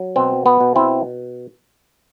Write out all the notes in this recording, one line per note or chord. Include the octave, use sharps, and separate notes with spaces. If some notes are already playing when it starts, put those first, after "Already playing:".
Already playing: F#3
B2 C4
B3
B2
C4 E4